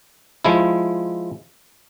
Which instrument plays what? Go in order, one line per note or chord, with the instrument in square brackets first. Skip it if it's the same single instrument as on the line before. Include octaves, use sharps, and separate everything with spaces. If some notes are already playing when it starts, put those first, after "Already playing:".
[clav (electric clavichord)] F3 G#3 E4